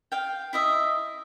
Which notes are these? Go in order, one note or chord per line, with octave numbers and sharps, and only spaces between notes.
F5 G5
E4 D#5 E5